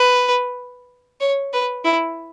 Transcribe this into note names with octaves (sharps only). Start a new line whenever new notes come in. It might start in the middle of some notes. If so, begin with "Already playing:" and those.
Already playing: B4
C#5
B4
E4